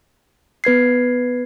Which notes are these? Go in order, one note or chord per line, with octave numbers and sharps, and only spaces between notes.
B3 B4 G#6 C7